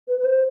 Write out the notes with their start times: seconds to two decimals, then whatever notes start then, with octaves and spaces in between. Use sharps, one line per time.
0.07 B4
0.18 B4
0.24 C5